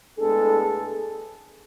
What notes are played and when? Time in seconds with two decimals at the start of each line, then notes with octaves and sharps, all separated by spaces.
0.18 A2 G#3 B3 D4 G#4 A4